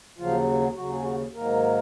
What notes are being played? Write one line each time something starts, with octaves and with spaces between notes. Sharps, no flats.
D#2 C#3 F3 F#3 F4
D#2 C#3 F#3 F#4
G#4
F#3 F#4
G#2 D#3 F#3 A#3 A#4